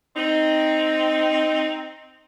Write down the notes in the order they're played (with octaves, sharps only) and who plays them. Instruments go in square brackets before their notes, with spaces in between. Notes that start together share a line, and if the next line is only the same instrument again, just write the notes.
[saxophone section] C4 D#4